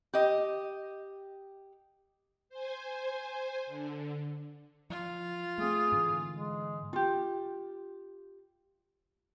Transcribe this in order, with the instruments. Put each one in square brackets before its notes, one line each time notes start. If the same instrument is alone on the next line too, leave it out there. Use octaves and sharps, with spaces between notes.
[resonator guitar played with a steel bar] G4 D#5
[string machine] C5 G#5
D3
[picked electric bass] F3 [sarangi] F4
[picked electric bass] A3 C4 [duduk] G#4
[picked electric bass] G#2 D3 E3
[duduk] G#3
[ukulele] F4 G4